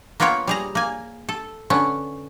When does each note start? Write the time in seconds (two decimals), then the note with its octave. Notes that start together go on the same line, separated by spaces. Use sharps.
0.20 A#3 B3 F4 C#5 G5
0.47 G3 G#4 A#5
0.75 A#3 G#5
1.29 A4
1.70 D3 B3 C#4